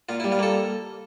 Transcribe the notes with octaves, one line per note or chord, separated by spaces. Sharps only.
A#2 F4
E4
G3
F4
A#3 A4